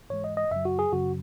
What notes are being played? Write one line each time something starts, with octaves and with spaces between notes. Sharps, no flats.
G#2 E3 G#3 C#5
D#5
D#5
F#2 C#3 F#3 E5
F#4
G#4
F#2 C#3 F#3 F#4